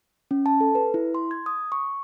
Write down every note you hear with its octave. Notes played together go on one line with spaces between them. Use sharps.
C#4
A5
A4
B4
E4
C6
G#6
D#6
C#6